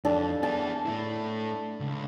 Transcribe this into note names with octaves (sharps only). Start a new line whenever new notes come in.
F2 D4 A4
B3 G#4 A5
A3 E4
C#2